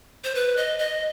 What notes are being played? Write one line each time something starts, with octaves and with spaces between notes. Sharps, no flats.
C5
B4
D#5
D#5